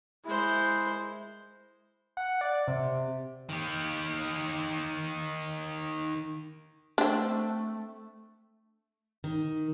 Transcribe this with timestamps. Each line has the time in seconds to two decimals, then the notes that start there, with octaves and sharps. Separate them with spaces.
0.25 G#3 E4 C5
2.17 F#5
2.41 D5
2.68 C3
3.49 D#3 G4
6.98 A3 C4 D4
9.24 D#3